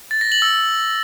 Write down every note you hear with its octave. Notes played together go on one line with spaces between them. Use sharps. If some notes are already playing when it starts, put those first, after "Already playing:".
A6
A#6
F#7
E6